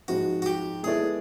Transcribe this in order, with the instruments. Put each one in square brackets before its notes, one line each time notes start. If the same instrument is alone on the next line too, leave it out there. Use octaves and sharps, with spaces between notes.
[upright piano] G#2 F3 G#3 C4 D#4 [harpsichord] F#4
[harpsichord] F#4
G4
[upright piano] G#3 B3 E4 A4 D5 [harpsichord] G#4